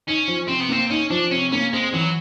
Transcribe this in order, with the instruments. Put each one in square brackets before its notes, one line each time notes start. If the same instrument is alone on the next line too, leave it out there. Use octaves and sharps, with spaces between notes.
[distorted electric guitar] C#4 [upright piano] D#4
[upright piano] F3
[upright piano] C3 [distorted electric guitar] C4
[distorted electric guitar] B3
[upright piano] A#3 [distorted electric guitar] C4
[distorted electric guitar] C#4 [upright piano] D#4
[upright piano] F3 [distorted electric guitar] D4
[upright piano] C3 [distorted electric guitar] C#4
[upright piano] A#3 [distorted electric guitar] C#4
[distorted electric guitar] G#3 [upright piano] C4
[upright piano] E3 [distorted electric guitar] F#3